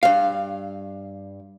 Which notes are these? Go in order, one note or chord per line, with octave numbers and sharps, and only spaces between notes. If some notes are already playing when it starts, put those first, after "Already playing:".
G2 F5